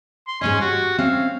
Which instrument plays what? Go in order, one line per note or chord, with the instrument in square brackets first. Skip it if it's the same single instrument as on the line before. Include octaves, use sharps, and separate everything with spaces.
[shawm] C6
[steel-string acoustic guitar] G#2 C3 D#5 [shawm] C#4
[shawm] F#4 [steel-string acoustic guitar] G4
[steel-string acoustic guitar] C4 C#4 E5 [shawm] F5